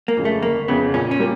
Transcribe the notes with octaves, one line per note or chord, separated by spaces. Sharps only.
A#3
F2 C#3
A3
G1 A#3
F2 C#3 B3
A#2 C#4
C#4
G3 A#3